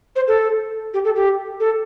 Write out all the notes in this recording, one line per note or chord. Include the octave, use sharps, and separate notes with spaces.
C5
A4
G4
A4
G4
A4